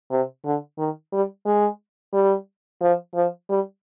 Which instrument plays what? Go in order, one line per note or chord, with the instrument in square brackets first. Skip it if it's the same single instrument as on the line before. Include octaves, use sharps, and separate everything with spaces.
[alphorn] C3
D3
D#3
G3
G#3
G3
F3
F3
G3